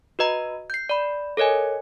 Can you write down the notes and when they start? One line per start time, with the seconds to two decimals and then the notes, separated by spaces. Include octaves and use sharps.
0.19 F#4 B4 D#5 A#5
0.70 G6 C7
0.89 D5 B5
1.37 A4 A#4 C#5 D#5 G#5